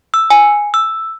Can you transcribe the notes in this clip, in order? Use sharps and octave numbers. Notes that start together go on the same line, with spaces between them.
E6
G#5
E6